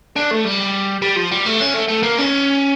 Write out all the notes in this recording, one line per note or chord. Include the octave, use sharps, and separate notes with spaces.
D4
A3
G3
G3
F3
G3
A3
C#4
A3
A3
A#3
C#4